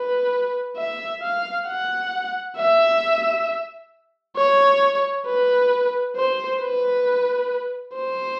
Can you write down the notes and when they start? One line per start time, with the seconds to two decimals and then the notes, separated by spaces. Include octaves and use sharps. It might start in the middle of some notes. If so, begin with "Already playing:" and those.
Already playing: B4
0.77 E5
1.22 F5
1.67 F#5
2.57 E5
4.36 C#5
5.26 B4
6.16 C5
6.61 B4
7.96 C5